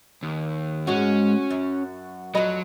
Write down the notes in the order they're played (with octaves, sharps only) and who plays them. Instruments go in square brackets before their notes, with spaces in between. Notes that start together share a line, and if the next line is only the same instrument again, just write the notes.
[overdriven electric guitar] D#2
[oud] G#2 G#3 [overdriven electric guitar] C#4 [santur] F#4
[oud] F#2
[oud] F2 D#5 [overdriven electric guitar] F#3 [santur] B5 C6